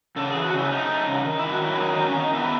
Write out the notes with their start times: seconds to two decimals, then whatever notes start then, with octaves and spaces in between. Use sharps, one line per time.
0.16 C#3 A4
0.30 E3 G#4
0.43 F#4
0.53 C#3 E4
0.71 A3 D#4
0.89 A3
1.07 C#3
1.25 D#3
1.39 D#3 E4
1.52 F#4
1.61 F#3 E4
1.79 D#3 D#4
1.93 D#3 D#4
2.07 C#4
2.16 D#3 D#4
2.34 B3 E4